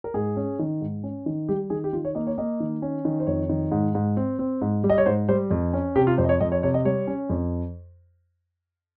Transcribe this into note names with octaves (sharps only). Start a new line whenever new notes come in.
A#4
G#2 G#4
C#4
D#3
G#2
C#4
D#3
G3 G4
D#3 G#4
G4
D#3 F4
C#5
A#3 D#5
C#5
A#3 D#5
D#3
C#4
D#3
C5
F2 C#5
D#3
G#2
G#2
C4
C4
G#2
G3
D#5
C#5
G#2 C5
G3 C5
F2
C#4
C3 G4
F4
F2 C5
D#5
C#5
F2 D#5
C#5
C3 C#5
D#5
G3 C#5
C#4
F2